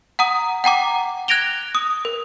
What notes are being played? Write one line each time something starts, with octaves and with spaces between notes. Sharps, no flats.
F#5 A#5 D#6
F#5 G5 A#5 D6
F#6 G#6 A#6 D7 F7 G7
D#6
A#4